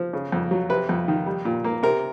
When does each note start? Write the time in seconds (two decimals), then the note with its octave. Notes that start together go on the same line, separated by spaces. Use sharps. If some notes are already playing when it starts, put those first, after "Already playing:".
Already playing: F3
0.13 C#3
0.32 F2
0.51 F#3
0.69 C3 B4
0.89 F2
1.08 D#3
1.26 G3
1.45 A#2
1.64 A#3
1.83 C3 A#4